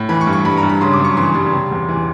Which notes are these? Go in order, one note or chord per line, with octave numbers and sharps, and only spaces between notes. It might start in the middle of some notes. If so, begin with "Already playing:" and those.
Already playing: A2
E3 B5
C#6
G2
C#6
G3 B5
A#5
G2
B5
C#3 C6
D6
F#2
C#6
E3 C6
G3
C3
E2
E3